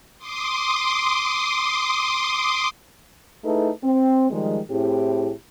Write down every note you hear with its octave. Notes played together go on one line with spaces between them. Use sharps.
C6 D6 D#6
A3 D#4 E4 G#4 A4 B4
C4
D#3 F3 G3 G#3
A2 C4 E4 G4 G#4